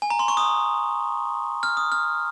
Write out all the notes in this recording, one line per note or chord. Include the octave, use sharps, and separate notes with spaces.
G#5
A#5
C6
C#6
D#6
F6
D#6
F6